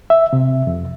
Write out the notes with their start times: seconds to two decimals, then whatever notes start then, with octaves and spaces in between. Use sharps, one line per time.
0.10 E5
0.33 C3
0.67 F2